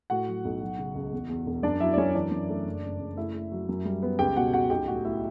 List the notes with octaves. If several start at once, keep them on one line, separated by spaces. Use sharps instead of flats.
A2 F#4 F#5
F#3
B1
F#3
C#3
C#2
E2
E2
E1
F#2 D4 D5
F#3 E4 E5
D5
F#2 C#4 C#5
E3 D4 D5
F#2
A3
F#1
F#1
F#1
A3 E4 E5
A3
F#3
F#2
G3
B3
C#2 G4 G5
B2 F#4 F#5
C#2 F#4 F#5
B1 G4 G5
A2 F#4 F#5
A3 E4 E5